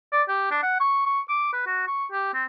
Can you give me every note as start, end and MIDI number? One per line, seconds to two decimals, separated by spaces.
0.13 0.23 74
0.29 0.47 67
0.51 0.59 62
0.63 0.76 78
0.80 1.04 85
1.06 1.21 85
1.29 1.49 86
1.53 1.64 71
1.67 1.85 66
1.87 2.06 85
2.12 2.29 67
2.34 2.45 60